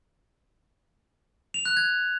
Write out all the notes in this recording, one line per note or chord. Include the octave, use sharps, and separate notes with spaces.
F7
F#6
G#6